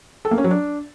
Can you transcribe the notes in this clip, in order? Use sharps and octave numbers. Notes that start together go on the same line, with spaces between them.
A4
A#3
C#4
F#3
D4